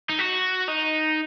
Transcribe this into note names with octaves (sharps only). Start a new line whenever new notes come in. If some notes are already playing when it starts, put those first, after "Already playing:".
D#4
F#4
D#4